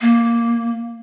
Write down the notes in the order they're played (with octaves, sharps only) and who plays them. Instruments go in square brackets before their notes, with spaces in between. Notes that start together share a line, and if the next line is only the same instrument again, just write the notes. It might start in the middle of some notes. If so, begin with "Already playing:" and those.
[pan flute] A#3